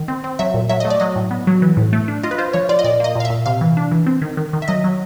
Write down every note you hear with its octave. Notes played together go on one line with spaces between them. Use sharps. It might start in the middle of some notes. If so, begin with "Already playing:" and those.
Already playing: D#3
C4
C4
F#3 E5
A#2
F#3 E5
A3 D#5
D5
F#3 D#5
A2
B3
F#3
E3
A2
A3
D4
F4 D#5
B4
F4 C5
F3 C#5
F4 D5
D#5
A#2 D5
A#3 D#5
A#2 F5
E5
A#2
C3 F5
E3
D4
E3
C4
D#3
D#3
D#3
E5
F#3 D#5
F#3